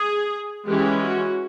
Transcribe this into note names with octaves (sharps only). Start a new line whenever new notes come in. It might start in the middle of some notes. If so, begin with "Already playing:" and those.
Already playing: G#4
E3 G#3 C#4 G4
F#4